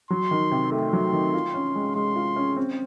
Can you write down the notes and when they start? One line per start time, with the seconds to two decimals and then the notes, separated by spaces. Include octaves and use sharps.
0.10 F#3 C6
0.31 D#3
0.51 C3
0.72 A3 C6
0.93 F#3
1.13 D#3
1.34 F4
1.54 C#4
1.75 G#3
1.95 G#3 C6
2.16 F4
2.36 C#4
2.57 C4